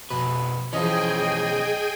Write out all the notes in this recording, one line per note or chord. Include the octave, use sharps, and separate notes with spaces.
F2 B2 B4
B1 E3 F3 C#4 G#4 D#5 G5 G#5